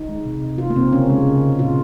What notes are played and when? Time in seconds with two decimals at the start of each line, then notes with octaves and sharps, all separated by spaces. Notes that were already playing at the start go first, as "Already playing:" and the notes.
Already playing: D#4
0.09 G#3
0.25 C3
0.42 C3
0.58 C3 F4
0.70 A#3
0.76 C3 C4
0.92 C#3 C#4
1.10 G#3
1.26 C#3
1.42 C#3
1.59 A#2 F4